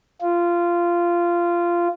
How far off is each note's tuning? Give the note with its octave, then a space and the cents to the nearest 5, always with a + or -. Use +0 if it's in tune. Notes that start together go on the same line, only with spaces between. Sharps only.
F4 -15